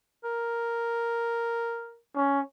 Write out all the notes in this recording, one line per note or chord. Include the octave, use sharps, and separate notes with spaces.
A#4
C#4